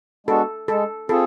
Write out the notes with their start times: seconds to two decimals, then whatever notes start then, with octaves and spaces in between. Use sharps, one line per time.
0.27 G#3 B3 D4 F#4 A4
0.68 G#3 A4
1.09 C4 F4 G#4 A4